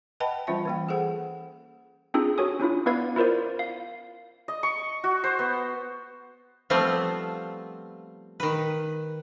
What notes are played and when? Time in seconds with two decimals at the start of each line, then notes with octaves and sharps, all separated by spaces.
0.20 B4 D#5 F#5 G5 A5 B5
0.47 E3 G3 C#4 F4 C5 E5
0.66 E3 A#3 G5
0.89 G#4 A4 C5 F#5
2.14 C4 D4 D#4 F4 G#4 A4
2.38 F#4 A4 C#5 G#5 D#6
2.60 C#4 D4 E4 F4
2.86 B3 E4 B4 D5 F5 G#6
3.16 E4 F4 A#4 C5 D5
3.59 F5
4.48 D#5
4.63 C#6
5.04 F#4
5.24 C5
5.39 B3
6.70 F3 G3 A3 B3 C4 F4
8.40 D#3 B4